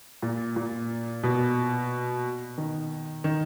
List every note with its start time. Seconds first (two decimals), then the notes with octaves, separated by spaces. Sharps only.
0.22 A#2
0.56 A#2
1.23 B2
2.58 D#3
3.24 D#3